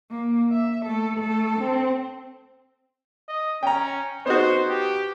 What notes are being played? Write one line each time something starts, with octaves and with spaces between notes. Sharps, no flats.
A#3
E5
A3 A4
A3 A4
C4
D#5
C#4 G5 A#5
B3 D#4 F#4 C5
G4